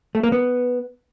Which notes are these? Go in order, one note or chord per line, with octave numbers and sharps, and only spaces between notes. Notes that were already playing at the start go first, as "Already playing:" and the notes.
A3
A#3
B3